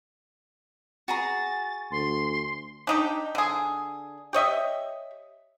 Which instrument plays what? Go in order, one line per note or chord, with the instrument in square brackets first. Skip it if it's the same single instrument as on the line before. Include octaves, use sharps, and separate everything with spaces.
[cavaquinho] F#4 G#4 A#5 [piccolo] A6
[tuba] D2 [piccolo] C6
[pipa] D4 D#4 G4
D3 G#4
G4 C#5 D#5 E5